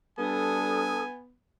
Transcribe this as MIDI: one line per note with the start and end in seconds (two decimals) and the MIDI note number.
0.18 1.06 55
0.18 1.34 59
0.18 1.06 62
0.18 1.02 69
0.18 1.21 80
0.18 1.02 87